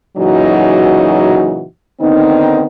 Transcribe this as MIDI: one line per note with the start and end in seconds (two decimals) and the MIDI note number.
0.17 1.64 46
0.17 1.64 49
0.17 1.64 52
0.17 1.64 54
0.17 1.64 63
0.17 1.64 66
2.01 2.65 50
2.01 2.65 51
2.01 2.65 59
2.01 2.65 60
2.01 2.65 63